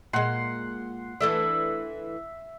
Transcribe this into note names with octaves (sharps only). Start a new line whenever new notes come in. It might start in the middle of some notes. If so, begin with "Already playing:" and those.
A#2 G#3 F#5 C6
E3 A3 D4 E5